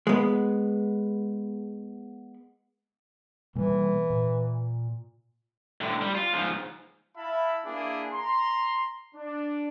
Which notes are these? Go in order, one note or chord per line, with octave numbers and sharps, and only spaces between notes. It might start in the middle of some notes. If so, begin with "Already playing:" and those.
G#3 B3
B2 E3 G3 A#3
A#2
A2 D3
G3
F4
G#2 F3
E4 E5 F5 A5 B5
A#3 D4 E4 G#4
A#5 C6
D4